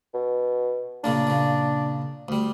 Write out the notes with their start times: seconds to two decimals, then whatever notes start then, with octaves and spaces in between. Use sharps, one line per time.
0.14 B2
1.04 A#2 C#3 A#3 D4
1.27 A#2 C#3
2.28 D2 G3